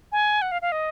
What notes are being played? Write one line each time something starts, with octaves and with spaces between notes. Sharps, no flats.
G#5
F#5
F5
F5
D#5